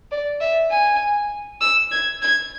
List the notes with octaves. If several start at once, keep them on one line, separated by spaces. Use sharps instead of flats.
D5
E5
G#5
E6
G#6
G#6